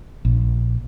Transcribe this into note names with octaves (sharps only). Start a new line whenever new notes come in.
A#1